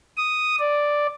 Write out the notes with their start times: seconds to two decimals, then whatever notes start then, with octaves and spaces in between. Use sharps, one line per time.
0.17 D#6
0.59 D5